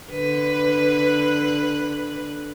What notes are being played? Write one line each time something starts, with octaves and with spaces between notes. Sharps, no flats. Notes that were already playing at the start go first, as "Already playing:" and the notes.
D3 B4